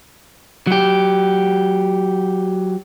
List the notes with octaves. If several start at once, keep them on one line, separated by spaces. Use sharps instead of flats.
F#3 G4